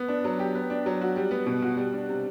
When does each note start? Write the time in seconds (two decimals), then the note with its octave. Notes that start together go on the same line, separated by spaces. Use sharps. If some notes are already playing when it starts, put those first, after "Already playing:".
Already playing: B3
0.08 D4
0.24 F#3
0.39 G4
0.55 B3
0.70 D4
0.86 F#3
1.01 F#4
1.16 G3
1.31 B3
1.46 B2
1.62 F#4
1.77 G3
1.93 D4
2.08 C3